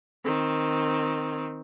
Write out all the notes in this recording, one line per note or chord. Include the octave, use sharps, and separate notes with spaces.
D#3 C4